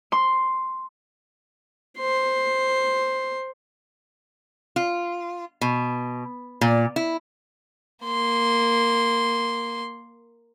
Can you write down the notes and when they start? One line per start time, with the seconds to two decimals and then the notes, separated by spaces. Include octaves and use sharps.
0.12 C6
1.99 C5 C6
4.76 F4
5.61 B2
6.61 A#2
6.96 E4
8.05 A#3 C6